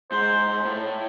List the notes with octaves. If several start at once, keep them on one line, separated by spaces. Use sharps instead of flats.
G#2 C5
A2